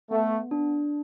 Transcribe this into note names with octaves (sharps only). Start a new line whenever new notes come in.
A3 B3
D4